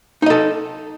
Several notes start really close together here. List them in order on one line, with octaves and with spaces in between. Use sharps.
D#4 D#5 A4